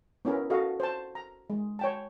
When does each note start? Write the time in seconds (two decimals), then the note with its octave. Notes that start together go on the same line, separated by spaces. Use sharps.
0.25 B3 C#4 E4 A#4
0.50 F#4 A4 D#5 F5
0.80 C5 A5
1.15 A#5
1.50 G#3
1.79 C#5 G5 A5